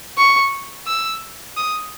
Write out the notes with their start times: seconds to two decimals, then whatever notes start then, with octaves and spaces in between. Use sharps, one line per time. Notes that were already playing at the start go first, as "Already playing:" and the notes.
0.18 C#6
0.87 E6
1.57 D#6